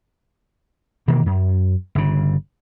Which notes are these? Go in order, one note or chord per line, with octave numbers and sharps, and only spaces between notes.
B2 D#3 E3 A#3
F#2
G1 C#3